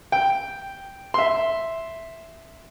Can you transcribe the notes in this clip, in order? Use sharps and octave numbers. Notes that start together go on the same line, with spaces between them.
G5
E5 C6